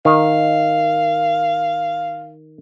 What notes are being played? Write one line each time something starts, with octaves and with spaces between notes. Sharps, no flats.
D#3 F5